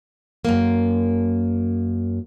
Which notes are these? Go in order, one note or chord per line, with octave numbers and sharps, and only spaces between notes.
F#2 A#3